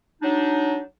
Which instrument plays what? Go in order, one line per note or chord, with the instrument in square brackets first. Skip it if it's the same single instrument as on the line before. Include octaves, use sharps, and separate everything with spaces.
[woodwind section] F#3 D4 D#4